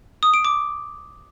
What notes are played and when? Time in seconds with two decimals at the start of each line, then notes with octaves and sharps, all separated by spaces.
0.23 D#6
0.34 D7
0.45 D6